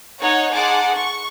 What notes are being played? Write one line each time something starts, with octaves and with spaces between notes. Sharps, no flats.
D#4 C#5 F#5
D#4 G#4 F#5 A5 C6 D6
C#6